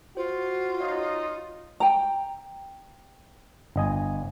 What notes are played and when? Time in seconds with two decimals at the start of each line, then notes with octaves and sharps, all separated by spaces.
0.17 F4 F#4 C5
0.80 D#4 C#5 D#5 F5
1.80 G5 A#5
3.76 G1 D#5 G#5